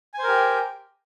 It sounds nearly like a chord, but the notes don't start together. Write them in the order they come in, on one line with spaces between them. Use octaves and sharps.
G#5 C5 A#4 G4